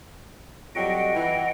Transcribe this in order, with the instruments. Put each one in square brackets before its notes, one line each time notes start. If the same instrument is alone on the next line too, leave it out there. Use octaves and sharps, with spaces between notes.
[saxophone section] F2 F#3 G3 [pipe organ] D#5 F#5 G5
[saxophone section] E3